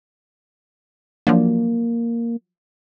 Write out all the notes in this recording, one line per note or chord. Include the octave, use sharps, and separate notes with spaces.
F3 F#3 A#3 D4